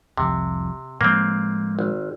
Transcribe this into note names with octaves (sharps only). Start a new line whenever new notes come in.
F1 C2 C3 F3
A2 F3 G#3 A#3 C4
G#1